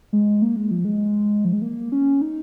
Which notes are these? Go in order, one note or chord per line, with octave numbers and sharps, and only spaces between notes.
G#3
A#3
G#3
F3
G#3
F3
G#3
A#3
C#4
D#4